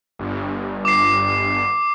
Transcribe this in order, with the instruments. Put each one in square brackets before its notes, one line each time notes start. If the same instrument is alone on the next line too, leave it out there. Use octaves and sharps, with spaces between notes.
[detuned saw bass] G1
[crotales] D6 C7